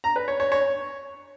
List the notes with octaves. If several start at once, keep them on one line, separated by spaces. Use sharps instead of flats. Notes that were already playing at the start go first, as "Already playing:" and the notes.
A#5
B4
C#5
C#5
C#5